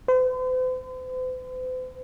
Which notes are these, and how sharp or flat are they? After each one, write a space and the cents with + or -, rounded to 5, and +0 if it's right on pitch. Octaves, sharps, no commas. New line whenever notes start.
C5 -45